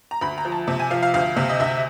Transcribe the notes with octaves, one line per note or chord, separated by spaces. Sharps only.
A#5
D2 B5
A#5
F3
A5
C3 A5
G#5
F3 F5
F5
D2 F5
C3
D#5
D2 E5